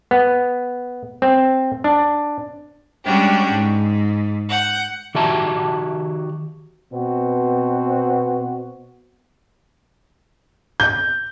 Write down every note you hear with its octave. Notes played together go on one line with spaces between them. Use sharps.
B3
C4
D4
G3 G#3 C#4 D4 F#4 G4
G#2
F#5 G6
D#3 F#4 G4 E5 A5 A#5
B2 B3 C4 F#4
G6